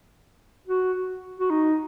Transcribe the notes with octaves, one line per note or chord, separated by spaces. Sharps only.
F#4
F#4
D#4